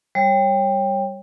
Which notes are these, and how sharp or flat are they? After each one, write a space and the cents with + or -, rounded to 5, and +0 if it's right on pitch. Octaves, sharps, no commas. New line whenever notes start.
G3 +15 C#5 -20